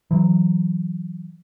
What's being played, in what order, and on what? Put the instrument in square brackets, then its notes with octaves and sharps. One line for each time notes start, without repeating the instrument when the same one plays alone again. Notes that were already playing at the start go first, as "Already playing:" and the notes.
[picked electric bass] E3 F#3